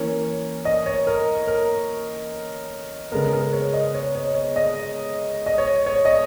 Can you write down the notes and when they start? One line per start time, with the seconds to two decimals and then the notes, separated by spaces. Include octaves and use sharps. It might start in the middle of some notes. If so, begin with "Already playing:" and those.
Already playing: E3 A#3 C#4 C#5
0.65 D#5
0.86 C#5
1.07 A#4
1.47 A#4
3.12 C#3 G#3 B3 A#4
3.33 A#4
3.53 C#5
3.73 D#5
3.94 C#5
4.15 C#5
4.35 C#5
4.56 D#5
5.46 D#5
5.58 C#5
5.86 C#5
6.05 D#5